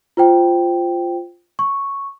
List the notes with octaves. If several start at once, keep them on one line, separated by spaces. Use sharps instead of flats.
F4 C5 G5
C#6